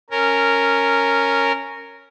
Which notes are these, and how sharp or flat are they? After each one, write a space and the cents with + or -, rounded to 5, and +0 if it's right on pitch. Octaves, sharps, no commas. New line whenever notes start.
C#4 +0 A#4 -10